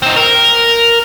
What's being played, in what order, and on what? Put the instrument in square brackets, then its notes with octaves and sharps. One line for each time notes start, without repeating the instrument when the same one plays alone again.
[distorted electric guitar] C4 D#4
A#4